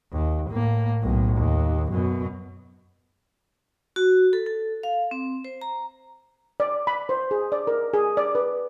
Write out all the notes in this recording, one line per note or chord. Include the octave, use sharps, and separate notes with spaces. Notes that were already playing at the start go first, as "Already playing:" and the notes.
D#2
A2 A#3
B1 A2
D#2
F#2 B2
F#4
A4
A4
F5
C4
C5
A#5
D5
B5
C5
G#4
D5
A#4
G#4
D5
B4